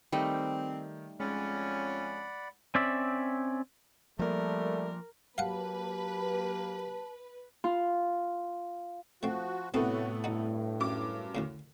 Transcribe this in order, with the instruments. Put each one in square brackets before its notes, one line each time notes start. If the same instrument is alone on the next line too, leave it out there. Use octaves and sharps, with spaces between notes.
[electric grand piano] D#3 [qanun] G3 A3 D#4 [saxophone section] C4
[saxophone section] F2 C#4 [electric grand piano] G#3 [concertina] D5 F#5 B5
[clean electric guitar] C4 C#4 D5 E5
[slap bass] F3 A#3 [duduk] G3 [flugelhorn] A3 [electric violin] A#4
[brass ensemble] F#3 A#3 G4 [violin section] B4 [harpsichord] F5 F#5 [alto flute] A5
[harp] F4
[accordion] F3 F#4 [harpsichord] A3 C4
[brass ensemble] A2 [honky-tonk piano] C3 A3 B3 [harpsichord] C4 A4 [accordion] F#4
[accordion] G2 [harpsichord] D#4 F#4
[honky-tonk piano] F#2 D6
[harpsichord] D2 A2 C#3